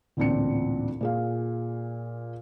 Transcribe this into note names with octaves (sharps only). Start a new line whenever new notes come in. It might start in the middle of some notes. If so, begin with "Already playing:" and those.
A1 D2 A#2 C4 D4 C#7
A#2 G#4 F5